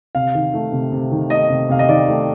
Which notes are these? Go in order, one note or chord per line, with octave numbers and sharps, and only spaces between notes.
C3 F5
D#3
A3
C3
C3
D#3
A3 D#5
C3
C3 F5
D#5
D#3 D5
A3